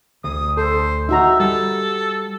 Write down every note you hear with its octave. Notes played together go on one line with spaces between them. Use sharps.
D2 D#6
A4 C5
D#4 F#4 E5 A#5
G3 A4